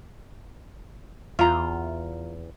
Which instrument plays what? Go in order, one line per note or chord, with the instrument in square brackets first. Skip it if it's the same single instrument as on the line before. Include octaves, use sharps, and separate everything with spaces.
[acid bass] E2 [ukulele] F4 A#5